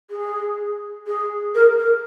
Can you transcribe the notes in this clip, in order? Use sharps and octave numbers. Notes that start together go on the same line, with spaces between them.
G#4
G#4
A#4
A#4